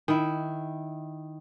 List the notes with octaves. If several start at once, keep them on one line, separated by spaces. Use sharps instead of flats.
D#3 E4